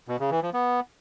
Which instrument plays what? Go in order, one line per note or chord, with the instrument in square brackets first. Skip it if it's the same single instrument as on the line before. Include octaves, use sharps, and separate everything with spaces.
[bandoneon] B2
C#3
E3
F3
B3